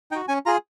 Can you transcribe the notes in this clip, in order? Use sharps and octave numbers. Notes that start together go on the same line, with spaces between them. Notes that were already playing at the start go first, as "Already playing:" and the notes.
D#4 F#4 G5
C#4 G#5
F4 G#4 A#5